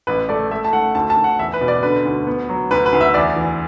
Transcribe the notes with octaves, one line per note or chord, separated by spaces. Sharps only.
A1 B4
A3 D5
A3 E5
A5
A3 F#5
D2 A5
A5
D2
F#5
E2 E5
B4
B2
D5
D3 B4
D2
B3
F#3
D2 B4
B4
D2
E5
E2 D5
E3